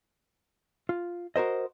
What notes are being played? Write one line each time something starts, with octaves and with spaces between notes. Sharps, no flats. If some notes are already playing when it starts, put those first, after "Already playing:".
F4
F#4 A#4 C5 D#5